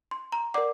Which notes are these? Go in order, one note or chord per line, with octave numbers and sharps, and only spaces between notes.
C6
A#5
A#4 D5 F#5 D6